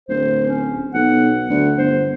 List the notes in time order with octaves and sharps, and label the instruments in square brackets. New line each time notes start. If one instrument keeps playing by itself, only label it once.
[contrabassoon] D1 [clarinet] C5
[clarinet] C#4
[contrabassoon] B1 [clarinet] F#5
[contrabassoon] D2
[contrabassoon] G1 [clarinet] C5